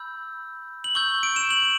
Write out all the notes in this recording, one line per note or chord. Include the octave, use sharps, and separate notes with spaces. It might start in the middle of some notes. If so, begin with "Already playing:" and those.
Already playing: B5 E6 G6
F#7
C#6 E6 G6 G7
D7
E7
F#7